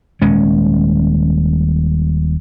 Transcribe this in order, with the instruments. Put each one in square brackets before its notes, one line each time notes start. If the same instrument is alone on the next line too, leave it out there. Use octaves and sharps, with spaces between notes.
[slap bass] D#1 G#3 C#4